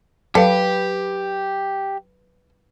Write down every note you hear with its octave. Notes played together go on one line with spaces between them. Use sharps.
F#3 G4 A4 B4 F5